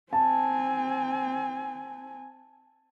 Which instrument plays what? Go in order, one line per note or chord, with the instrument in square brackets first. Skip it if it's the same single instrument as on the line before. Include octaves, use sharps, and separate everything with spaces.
[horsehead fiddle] C4 G#5 [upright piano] A5